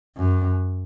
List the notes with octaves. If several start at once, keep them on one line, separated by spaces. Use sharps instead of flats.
F#2